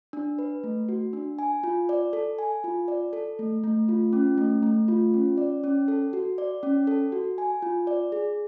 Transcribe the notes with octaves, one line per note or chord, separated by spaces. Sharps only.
D4
B4
A3
F#4
D4
G#5
F4
D5
A4
G#5
F4
D5
A4
A3
A3
F4
C#4
A3
A3
F4
C#4
D5
C#4
A4
F#4
D5
C#4
A4
F#4
G#5
F4
D5
G#4